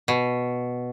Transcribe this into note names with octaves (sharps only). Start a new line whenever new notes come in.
B2